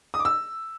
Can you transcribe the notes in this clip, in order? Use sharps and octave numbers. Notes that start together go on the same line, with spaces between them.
D#6
D6
E6